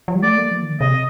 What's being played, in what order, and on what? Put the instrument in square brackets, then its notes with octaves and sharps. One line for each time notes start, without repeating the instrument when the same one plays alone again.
[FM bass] F3
G3
[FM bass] A3 [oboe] D5
[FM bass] A#3
F3
D#3
D3
[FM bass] C3 [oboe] D#5